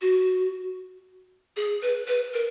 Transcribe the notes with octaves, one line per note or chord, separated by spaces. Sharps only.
F#4
G#4
B4
B4
A#4